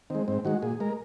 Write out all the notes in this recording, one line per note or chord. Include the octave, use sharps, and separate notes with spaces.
D#3 G#3 C4
G#2 C4
D#3 G#3 F#4
A#2 G#4
G#3 A#4